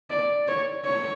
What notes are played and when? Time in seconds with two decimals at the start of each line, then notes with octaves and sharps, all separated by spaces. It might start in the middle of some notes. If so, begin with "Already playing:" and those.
0.10 D5
0.48 C#5
0.85 C#5